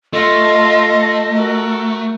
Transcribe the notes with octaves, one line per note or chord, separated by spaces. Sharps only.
A3 F4 D#5
F#4 A#4